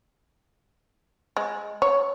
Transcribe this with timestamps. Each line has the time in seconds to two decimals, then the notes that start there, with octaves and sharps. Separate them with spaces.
1.37 G#3
1.82 C#5